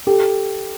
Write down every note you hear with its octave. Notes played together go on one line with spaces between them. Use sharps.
G4 A4